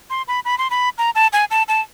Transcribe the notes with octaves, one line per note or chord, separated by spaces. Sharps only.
C6
B5
B5
C6
B5
A#5
A5
G#5
A5
A5